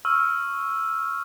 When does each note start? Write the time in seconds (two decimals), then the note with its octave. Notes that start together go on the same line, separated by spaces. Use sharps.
0.05 C#6 E6 F6